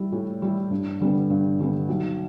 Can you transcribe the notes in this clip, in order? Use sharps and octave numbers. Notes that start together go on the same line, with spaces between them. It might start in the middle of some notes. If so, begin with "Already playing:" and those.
Already playing: G3 E4
A2
G3 E4
G2
D3 G3 B3
G2
D3 G3 B3
B1